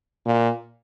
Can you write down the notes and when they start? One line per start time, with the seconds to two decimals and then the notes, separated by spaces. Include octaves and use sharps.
0.26 A#2